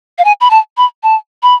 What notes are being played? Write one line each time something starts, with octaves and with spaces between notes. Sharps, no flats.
F5
G#5
B5
A5
B5
A5
B5